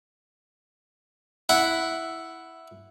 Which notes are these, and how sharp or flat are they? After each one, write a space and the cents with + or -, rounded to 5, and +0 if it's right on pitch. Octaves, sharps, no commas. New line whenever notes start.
E4 +0 F#5 +0